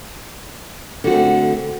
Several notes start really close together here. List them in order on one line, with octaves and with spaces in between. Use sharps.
D3 F#4 C4 A3